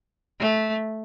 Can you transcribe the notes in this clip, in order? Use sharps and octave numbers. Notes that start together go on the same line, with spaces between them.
A3